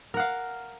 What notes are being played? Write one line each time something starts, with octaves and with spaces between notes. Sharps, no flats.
A#4 F5 F#5